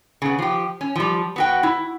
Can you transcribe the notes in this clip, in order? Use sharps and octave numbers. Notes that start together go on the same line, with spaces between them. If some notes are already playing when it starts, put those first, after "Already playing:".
C#3 B3
F3 G4
C#4
F3 G3
B3 F#4 G5
E4